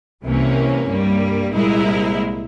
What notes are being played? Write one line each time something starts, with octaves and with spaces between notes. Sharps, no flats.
C2 C3 E3 A#3 C#4
G2 G3 A#3
C2 A#2 G#3 E4 A#4